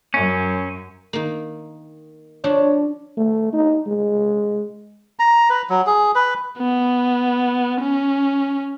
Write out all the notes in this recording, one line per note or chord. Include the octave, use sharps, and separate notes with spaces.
F#2 C#4
D#3 A#3
F3 D4 C#5
A3
D#4
G#3
A#5
B4
F#3
G#4
B4
B3
C#4